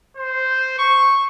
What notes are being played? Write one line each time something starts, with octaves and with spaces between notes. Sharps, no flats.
C5
C#6